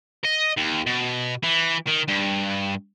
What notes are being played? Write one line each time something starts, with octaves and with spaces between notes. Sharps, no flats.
D#5
D#2
B2
E3
D#3
G2